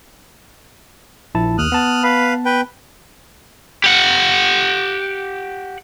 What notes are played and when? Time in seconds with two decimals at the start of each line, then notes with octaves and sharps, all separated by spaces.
1.35 A#1 E4 A5
1.58 D#2 D#6 F6 F#6
1.72 B3 A5
2.03 B4 F5 B5
2.45 B4 G5
3.84 G4 F#5